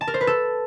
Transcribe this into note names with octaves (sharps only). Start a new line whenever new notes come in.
A5
A#4
C5
B4
A4